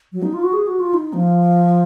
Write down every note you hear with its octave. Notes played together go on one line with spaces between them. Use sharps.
F#3
D#4
F4
F#4
G#4
F#4
F4
D#4
F3